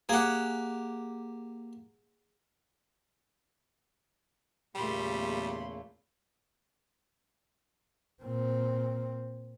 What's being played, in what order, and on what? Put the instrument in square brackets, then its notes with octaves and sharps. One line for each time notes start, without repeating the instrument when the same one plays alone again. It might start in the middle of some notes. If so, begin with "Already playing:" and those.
[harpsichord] A#3 G4 [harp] G#4 F#5
[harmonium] E2 C#3 A#3 [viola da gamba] A#2 A3 [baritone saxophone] G3 [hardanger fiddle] B5 C6
[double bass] A#2 C4